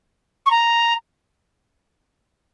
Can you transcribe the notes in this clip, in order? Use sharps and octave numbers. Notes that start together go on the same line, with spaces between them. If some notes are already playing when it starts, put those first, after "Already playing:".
C#6
A#5